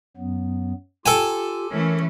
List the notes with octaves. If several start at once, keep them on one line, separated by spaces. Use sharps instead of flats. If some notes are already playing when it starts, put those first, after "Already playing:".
F#2 F#3 B3
F4 G4 A4 G5 G#5
E3 A3 C#4 A#4 C#5